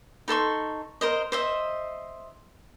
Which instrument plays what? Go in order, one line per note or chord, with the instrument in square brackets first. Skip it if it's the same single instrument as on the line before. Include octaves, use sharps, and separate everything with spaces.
[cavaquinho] D#4 A4 C6 C#6
A#4 C5 D#5
C5 D#5 E5